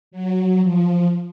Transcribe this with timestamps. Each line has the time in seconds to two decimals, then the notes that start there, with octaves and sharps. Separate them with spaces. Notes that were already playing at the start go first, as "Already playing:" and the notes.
0.11 F#3
0.62 F3